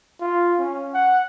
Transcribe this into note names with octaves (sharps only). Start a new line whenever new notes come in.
F4
C#4
F#5